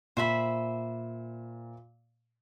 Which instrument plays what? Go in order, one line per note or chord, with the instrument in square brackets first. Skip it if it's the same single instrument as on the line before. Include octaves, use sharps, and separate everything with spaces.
[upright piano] A#2 [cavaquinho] C5 E5 B5